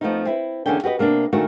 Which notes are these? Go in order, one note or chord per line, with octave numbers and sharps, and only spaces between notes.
F2 F3 A3 B3 C#4 D#4
C4 E4 B4
E2 D3 A#3 C#4 D4 G5
F#4 G4 B4 D#5
C3 A#3 B3 D4
A#2 D#3 A3 A#3 D4 F#4